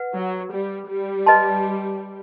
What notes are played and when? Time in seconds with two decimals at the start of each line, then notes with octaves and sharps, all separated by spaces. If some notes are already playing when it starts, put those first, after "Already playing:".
Already playing: B4 F#5
0.14 F#3
0.52 G3
0.89 G3
1.26 B4 D#5 A5 C6